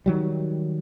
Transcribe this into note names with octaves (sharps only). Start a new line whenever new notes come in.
D#3 F#3 G3